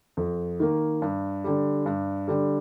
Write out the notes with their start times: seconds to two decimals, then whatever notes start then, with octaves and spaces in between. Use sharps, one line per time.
0.17 F2
0.60 D#3 A#3
1.02 G2
1.44 D3 G3
1.86 G2
2.28 D3 G3